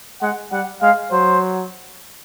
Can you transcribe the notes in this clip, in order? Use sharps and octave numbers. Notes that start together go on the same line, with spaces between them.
G#3 F#5
G3 F#5
G#3 F5
F#3 C5